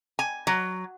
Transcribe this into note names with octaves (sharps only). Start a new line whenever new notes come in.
G#5
F#3